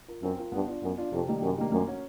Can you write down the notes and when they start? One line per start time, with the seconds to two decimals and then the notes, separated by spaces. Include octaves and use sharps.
0.08 F4 A#4
0.23 F#2 C4
0.38 F4 A#4
0.52 G2 B3
0.67 D4 F4
0.83 F#2 B3
0.97 D4 F4
1.13 F2 C3
1.28 D#3 G3 A#3
1.42 F#2 C3
1.58 D#3 G3 A#3
1.72 F#2 A#3
1.87 C#4 F#4